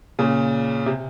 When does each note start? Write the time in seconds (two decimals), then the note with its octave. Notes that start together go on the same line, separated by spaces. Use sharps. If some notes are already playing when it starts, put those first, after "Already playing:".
0.19 A#2 C#3
0.86 C3